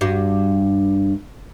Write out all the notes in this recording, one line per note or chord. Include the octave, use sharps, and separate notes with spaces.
G2 F#4